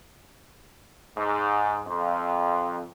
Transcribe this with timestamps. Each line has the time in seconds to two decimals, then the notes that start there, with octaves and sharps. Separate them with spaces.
1.17 G#2
1.87 F2